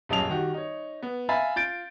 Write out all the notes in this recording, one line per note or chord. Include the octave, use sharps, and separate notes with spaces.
D#1 B1 F#2 G#4 A5 F7
D#3 F#4 G4
D#4 C#5
B3
E5 F5 G#5 A#5 B5 A6
F4 G6 A6 D7